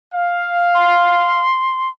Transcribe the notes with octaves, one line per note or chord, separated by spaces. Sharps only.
F5
C6